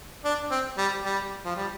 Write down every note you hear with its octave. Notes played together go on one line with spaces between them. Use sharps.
D4
C4
G3
G3
F3
G3